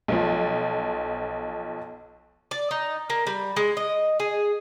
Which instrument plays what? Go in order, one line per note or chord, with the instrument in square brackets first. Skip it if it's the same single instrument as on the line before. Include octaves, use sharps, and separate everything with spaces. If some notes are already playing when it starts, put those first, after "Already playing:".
[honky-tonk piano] B1 F3
[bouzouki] D5
D#4
A#3
G3
G#3
D#5
G#4